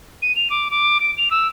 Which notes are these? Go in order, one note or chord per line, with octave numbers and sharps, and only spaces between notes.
D#7
F7
D6
D6
D7
F7
E6